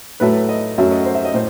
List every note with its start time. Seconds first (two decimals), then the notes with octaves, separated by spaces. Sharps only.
0.20 A2 F#3 A3 B4
0.49 D#5
0.78 F#2 F#3 A3 E5
0.91 D#5
1.05 C5
1.15 E5
1.25 D#5
1.34 A2 C5